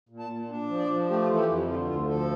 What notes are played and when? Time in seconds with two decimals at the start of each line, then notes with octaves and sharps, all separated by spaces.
0.09 A#2
0.19 A5
0.30 A#2
0.49 D4
0.68 F3
0.79 D5
0.89 F3
1.09 A3 G4
1.24 F4
1.29 E3
1.34 A4
1.39 G4
1.49 F2 E4
1.69 D3 F4
1.89 D2 F4
2.09 F3 A4